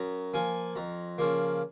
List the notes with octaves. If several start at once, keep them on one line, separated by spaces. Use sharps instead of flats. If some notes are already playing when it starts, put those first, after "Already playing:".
Already playing: F#2 A#5
F3 A#3 G#5
F2 A#5
C#3 F3 A#3